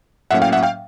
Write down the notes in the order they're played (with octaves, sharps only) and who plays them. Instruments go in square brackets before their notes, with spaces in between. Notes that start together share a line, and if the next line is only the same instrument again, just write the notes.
[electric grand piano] A2 F#3 A#3 C#4 E5 F#5
F5 G5
E5 F#5
F5 G5